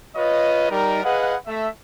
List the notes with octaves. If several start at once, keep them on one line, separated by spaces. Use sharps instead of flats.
F4 B4 C#5 D#5
G3 D#4 A#4
G#4 B4 D#5 F5 F#5
A3 E5